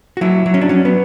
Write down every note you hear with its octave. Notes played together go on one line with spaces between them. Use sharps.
F#4
F#3 E4
F#3
C#4
D4
F#3 C#4
B3